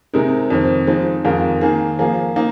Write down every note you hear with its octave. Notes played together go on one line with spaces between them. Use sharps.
C3 G#3 D#4 A#4
F2 D#3 C4
F3 G#3 C4 D#4
F2 D#3 G#3 F4 A#4
D#3 A#3 G#4
F3 A#3 G#4
A#3 D#4